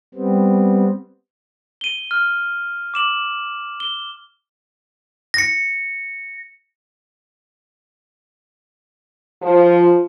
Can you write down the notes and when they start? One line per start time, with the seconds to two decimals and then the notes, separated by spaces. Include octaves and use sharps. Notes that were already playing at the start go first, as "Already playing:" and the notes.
0.15 G3 B3 C4
1.81 D#7 G7
2.11 F6
2.94 D6 E7 F#7
3.80 G7
5.34 A#6 C#7
9.42 F3